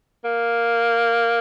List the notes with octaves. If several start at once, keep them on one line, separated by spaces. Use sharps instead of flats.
A#3